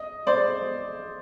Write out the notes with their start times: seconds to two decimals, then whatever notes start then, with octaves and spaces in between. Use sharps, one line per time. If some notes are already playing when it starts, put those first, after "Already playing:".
Already playing: D#5
0.27 C5 D5